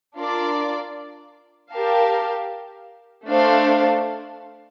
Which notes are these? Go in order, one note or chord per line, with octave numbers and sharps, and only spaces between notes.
D4 F4 A#4 D5
G4 A#4 F5 A5
A3 D4 A4 C5 F5